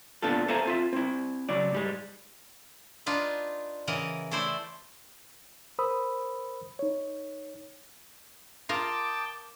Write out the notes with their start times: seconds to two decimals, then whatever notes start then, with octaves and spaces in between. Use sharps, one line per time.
0.22 A#2 B3 D4 F4 A4
0.48 A4 C5 E5 F5 G#5 A#5
0.65 C4 F4 E5
0.93 C4 E4
1.49 C#3 F#3 F#4 D5
1.72 G#2 G3 G#3
3.06 D4 D#4 F4 B4
3.87 C#3 E3 A#4 D#5 F#5
4.31 A3 E4 C5 D5
5.79 A#4 C5 B5 D#6 E6
6.79 D#4 C#5
8.69 F4 A#4 G5 A5 D6 D#6